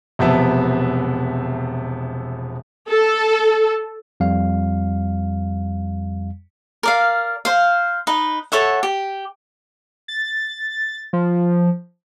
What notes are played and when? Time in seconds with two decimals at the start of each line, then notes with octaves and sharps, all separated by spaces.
0.19 E1 C3 F3 B3 E5 A5
2.89 A4
4.20 F2 G3 F5
6.83 A#4 D5 F5
7.45 C5 F5
8.07 D#4 B4
8.52 A4 C#5 E5 F#5
8.83 G4
10.08 A6
11.13 F3